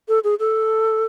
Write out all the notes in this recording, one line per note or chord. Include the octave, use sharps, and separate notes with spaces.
A4
G#4
A4